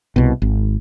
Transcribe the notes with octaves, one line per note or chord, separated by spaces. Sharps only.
C2 B2
G#1